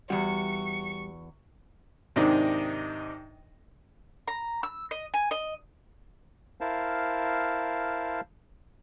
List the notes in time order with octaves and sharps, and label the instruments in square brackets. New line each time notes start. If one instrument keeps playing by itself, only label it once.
[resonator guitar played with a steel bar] E2 F#4 [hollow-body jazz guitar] G3 [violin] C#6 C#7
[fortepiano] G#2 C3 D#3 C4 D4 D#4
[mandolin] A#5
E6
D#5
G#5
D#5
[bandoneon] E4 A#4 C5 F5 A5